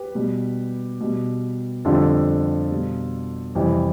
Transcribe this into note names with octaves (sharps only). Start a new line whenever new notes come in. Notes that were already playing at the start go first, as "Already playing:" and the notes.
Already playing: G4 B4
B2 G3
B2 G3
F2 D3 G3 F4 A4
B2 G3
F2 C3 E3 G3 E4 G4